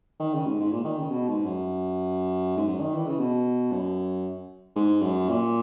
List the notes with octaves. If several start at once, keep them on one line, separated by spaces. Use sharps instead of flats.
D#3
C#3
G#2
G#2
A#2
D#3
C#3
B2
G#2
F#2
G#2
F#2
D#3
E3
C#3
B2
F#2
G#2
F#2
A#2